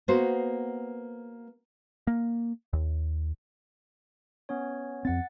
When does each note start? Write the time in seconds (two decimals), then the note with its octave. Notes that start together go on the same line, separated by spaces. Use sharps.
0.08 A#3 B3 F#4 C5
2.07 A#3
2.73 D#2
4.49 B3 C#4 C#5
5.05 F2 C4 F#5 A6